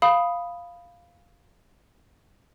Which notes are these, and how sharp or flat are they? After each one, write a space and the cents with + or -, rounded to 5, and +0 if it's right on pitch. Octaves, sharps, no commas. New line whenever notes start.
F5 +0 B5 +0 D#6 +0